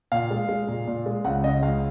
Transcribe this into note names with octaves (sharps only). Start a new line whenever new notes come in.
A#2 F5
G#3
G#3
A#2
A#2
G#3
C#2 F#5
C#3 D#5
C#2 F5